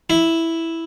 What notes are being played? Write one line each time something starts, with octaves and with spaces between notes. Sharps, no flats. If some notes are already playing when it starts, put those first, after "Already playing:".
E4